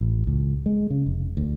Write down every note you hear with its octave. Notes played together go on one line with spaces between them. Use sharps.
A1
C#2
G#3
C#3
F1
D2